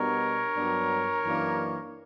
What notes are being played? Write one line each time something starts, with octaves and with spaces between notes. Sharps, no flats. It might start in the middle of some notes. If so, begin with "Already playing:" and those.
Already playing: B2 G3 B3 D4 A#4 C#5
G2 F#3 B3 D4
F#2 E3 A#3 D4